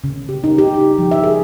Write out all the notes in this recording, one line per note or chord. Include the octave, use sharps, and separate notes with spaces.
C#3
G4
D#4
G4
D#4
F3
E5
G#4